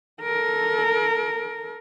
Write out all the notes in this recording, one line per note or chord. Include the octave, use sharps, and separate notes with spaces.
A4 A#4